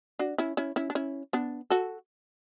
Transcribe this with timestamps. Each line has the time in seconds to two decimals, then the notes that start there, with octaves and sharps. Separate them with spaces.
0.19 D4 F#4
0.38 C#4 E4
0.57 C#4 E4
0.76 C#4 E4
0.90 D4
0.95 C#4 E4
1.33 B3 D4
1.70 F#4 A4